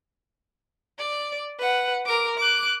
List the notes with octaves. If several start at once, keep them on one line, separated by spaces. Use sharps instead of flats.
D5
B4 F#5
A#4 D6
D6 F#6